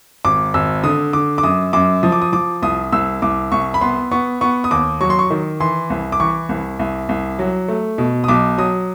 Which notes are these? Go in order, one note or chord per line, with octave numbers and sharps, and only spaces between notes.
G#1 D6
G#1 E6
D3 D#6
D3 D6
D6
F#2 D#6
F#2 D6
F3 D#6
D6
D#6
F3 D6
C2 D#6
C2 E6
C2 D6
C2 C#6
B5
B3 C6
B3 C#6
B3 C#6
D#6
D#2 D6
F#3 C#6
C6
C#6
D#3
E3 C6
C2
D6
E3 C#6
C2
C2
C2
F#3
A3
B2
D#6
B1 D6
F#3 D#6